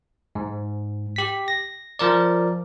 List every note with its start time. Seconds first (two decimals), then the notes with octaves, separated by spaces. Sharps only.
0.35 G#2
1.16 G4 B6
1.48 A#6
1.99 F3 A#4 D5